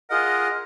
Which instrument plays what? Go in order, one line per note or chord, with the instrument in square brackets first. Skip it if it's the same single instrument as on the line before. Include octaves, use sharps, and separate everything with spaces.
[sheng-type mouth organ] F4 G#4 D#5 F#5 [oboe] A#4